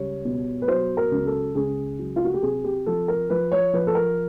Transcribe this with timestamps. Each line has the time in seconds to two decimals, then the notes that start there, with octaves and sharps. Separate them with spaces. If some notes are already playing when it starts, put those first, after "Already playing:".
Already playing: C#2 G3 C#5
0.25 B2
0.62 B4
0.68 F#3 C5
0.97 A#4
1.11 C#2
1.26 A4
1.55 C#2 G#4
1.99 F#3
2.16 F4
2.25 F#4
2.34 G4
2.42 C3 G#4
2.64 G4
2.86 F3 A4
3.08 A#4
3.30 F3 B4
3.52 C#5
3.73 F3 B4
3.87 A4
3.95 A#4